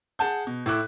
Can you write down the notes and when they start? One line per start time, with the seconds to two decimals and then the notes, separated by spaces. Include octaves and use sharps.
0.19 G#4 F#5 A5 G6
0.47 B2
0.66 A2 E4 D6 F#6